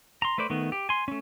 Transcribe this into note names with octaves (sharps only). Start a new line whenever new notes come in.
A#5 C6
A3 B4 C5 D5
D#3 A3 B3
G4
G#5 C6
A3 C#4